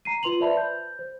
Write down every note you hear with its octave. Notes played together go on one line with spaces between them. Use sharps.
A#5 C7 D#7
F4 B4 C6 F7 F#7
B4 C5 D5 E5 A5 B5
G6
C5